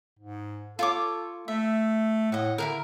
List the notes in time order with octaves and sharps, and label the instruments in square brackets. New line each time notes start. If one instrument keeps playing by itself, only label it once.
[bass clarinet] G#2
[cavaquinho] F4 C#5 D6 [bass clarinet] A4
[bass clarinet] A3 [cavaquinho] E5
[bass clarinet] A2 [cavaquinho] D#5 F#5
[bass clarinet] D3 [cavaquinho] E4 G#4 A#4